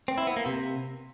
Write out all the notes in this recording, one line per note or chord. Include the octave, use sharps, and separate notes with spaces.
C4
E4
B3
A#3
C3